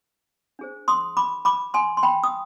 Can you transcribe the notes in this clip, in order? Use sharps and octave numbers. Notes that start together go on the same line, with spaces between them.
D4 G#4 C5
C6 D#6
B5 D6
B5 D6
G#5 C6
C6
G5 B5
D#6